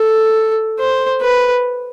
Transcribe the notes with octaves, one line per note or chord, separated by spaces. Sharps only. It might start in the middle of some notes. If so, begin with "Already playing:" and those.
Already playing: A4
C5
B4